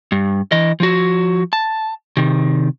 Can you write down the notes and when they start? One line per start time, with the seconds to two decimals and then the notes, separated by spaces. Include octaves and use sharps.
0.12 G2
0.52 E3 D#5
0.80 F3 F#4
1.53 A5
2.17 C3 D#3